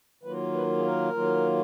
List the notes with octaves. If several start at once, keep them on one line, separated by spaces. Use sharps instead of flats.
D#3 F#3 A#3 F4 B4
B4
G#4
A#4
D#3 F#3 A#3 F4